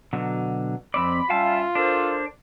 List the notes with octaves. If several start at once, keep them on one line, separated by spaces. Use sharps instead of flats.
B2 D3 F#3
F2 C4 D5 B5
G3 C#4 F4 E5 F5 G5 A5
D4 A4 A#4 C5